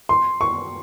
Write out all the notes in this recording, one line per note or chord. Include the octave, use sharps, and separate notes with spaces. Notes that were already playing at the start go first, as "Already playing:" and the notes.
C6
C#6